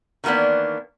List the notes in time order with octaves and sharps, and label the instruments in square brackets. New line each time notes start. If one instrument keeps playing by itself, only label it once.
[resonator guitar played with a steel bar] D#3 E3 A#3 B3 D4